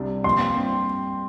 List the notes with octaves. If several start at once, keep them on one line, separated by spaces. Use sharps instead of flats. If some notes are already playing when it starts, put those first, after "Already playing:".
Already playing: C2 C3 G3 D4
A#2 F3 C4 C6
G2 G3 C4 G4